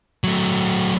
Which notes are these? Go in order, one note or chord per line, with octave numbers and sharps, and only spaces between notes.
F#3 A3